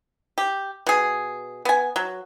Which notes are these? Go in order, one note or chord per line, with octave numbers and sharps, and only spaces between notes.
G4
B2 G#4
B3 G#5
F#3